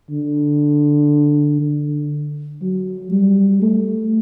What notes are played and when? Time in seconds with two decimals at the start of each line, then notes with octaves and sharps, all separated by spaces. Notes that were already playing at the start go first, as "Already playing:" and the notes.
0.10 D3
1.61 D3
2.62 F#3
3.12 G3
3.62 A3